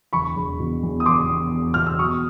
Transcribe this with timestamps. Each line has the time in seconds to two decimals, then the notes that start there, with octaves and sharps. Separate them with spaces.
0.13 E1 B5 C#6
0.36 E1
0.59 B2
0.83 E2
1.00 D#6
1.06 E1 C6 D6
1.30 B2
1.53 E1
1.74 B2 F6
1.86 E6
1.99 F#3 C#6 D#6